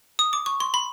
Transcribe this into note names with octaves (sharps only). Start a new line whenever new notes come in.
D#6
D6
C#6
C6
B5